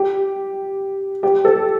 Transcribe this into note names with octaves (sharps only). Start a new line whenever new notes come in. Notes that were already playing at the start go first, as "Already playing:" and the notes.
Already playing: G4
G4
A4